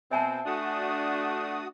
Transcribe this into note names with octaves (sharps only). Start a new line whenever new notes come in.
B2 C4 E5 G#5 A5
A3 D4 F#4 D#6